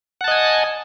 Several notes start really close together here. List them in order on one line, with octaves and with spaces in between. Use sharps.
F#5 A5 D#5 G#5